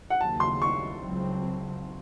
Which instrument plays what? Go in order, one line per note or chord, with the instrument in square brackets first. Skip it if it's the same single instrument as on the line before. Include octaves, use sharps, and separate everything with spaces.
[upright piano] F#5
[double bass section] D#2 C#3 F#3 [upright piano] A5
[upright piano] C6
C#6
[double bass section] C#2 C#3 F#3 C4